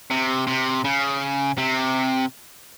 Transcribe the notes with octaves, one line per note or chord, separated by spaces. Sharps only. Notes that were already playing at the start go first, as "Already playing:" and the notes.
C3
C3
C#3
C3